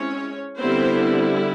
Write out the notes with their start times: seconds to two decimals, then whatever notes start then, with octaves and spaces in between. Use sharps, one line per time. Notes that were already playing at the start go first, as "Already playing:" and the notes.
Already playing: G#3 C4 C#4 E4 C#5
0.58 D3 G3 B3 C4 E4 C5